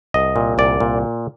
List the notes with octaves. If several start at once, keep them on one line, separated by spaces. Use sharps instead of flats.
C2 D#5
A#2
C2 D5
A#2